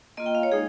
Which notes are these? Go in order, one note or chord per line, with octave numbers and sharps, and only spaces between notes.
A#3 F4 D#5
G5
F5
C#5
G#3 D#4 G#4